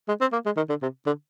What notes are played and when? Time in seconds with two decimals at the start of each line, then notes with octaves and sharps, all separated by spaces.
0.08 G#3
0.21 C4
0.33 A#3
0.46 G#3
0.57 D#3
0.69 D3
0.82 C3
1.06 D3